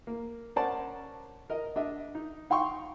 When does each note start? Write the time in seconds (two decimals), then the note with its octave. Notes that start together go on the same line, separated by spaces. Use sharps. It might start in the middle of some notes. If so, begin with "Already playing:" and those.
0.07 A#3
0.56 C#4 A#4 C5 D5 F#5 A5
1.50 A#4 D#5
1.76 D4 D#5 E5
2.15 D#4
2.50 D#4 F5 G5 C6 C#6